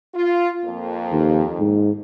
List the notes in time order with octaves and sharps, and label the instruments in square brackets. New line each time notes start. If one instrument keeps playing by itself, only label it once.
[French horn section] F4
F2 A#3
[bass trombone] D#2
G#2